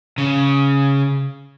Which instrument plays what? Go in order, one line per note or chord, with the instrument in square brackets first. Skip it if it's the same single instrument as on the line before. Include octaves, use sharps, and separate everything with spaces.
[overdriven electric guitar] C#3